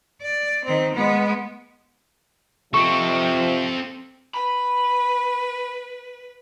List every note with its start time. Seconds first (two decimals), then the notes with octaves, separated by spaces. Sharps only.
0.22 D5
0.65 D#3 C4
0.94 G#3 B3
2.74 C3 F3 C4 A4 C#6
4.34 B4 B5